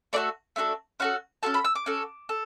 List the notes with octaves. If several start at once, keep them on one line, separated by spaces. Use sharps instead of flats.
A3 D4 F#4 A4 D5
A3 D4 F#4 A4
C#4 F#4 A4 F#5
C#4 F#4 A4 A5
B5
E6
D6
C#4 F#4 A4
A4